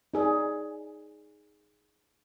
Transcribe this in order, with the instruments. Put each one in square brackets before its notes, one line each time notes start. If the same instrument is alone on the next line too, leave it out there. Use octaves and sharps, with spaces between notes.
[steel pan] D#4 G#4 D5